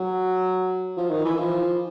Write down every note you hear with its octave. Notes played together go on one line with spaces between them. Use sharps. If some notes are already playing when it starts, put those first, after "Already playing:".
Already playing: F#3
F3
D#3
E3
F3